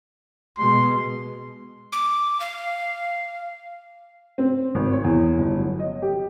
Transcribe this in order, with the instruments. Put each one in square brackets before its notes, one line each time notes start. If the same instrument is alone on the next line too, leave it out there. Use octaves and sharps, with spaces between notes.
[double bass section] B2 G#3 [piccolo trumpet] C6
[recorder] D6
F5
[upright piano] C4
G#1
C#5
E2
G1
F#3
D#5
G4